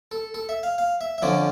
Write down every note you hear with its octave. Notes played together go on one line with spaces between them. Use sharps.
A4
A4
E5
F5
F5
E5
E5
F2 D3 F3 C#4 D5